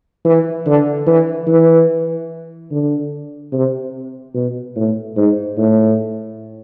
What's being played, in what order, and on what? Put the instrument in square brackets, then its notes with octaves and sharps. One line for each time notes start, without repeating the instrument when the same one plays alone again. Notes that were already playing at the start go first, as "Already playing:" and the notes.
[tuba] E3
D3
E3
E3
D3
C3
B2
A2
G#2
A2